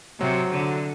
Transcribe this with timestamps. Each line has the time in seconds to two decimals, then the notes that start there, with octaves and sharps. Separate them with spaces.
0.20 C3 F#3
0.51 D3